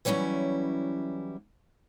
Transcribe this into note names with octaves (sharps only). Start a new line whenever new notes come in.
E3 F#3 G3 C#4 E4